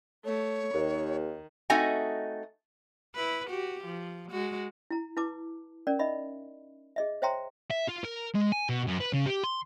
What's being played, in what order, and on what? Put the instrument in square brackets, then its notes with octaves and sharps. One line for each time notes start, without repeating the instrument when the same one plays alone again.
[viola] A3 [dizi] C#5
[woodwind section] D#2 [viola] D#3
[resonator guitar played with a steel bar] A3 C4 D#4 F#4 D#5 G#5
[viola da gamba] E4 B4
F#4 G4
F3
G#3 F#4
[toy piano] E4 A#5
E4 B4 A5 D6
C#4 A#4 D5
D#4 D#5 E5 B5
G#4 D#5 E5
C5 C#5 E5 G5 A#5 C6
[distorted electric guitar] E5
F4
A#4
G#3
G#5
B2
F#2
B4
C#3
G4
C6